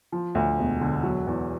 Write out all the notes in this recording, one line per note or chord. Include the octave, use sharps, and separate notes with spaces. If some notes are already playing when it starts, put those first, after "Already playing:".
F3
D2
E1
D3
F#3
E2